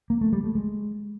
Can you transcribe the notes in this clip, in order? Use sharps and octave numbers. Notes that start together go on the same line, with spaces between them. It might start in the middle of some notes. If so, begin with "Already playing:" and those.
A#3
A3
G3
A3
G#3